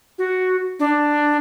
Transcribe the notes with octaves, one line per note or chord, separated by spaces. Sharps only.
F#4
D4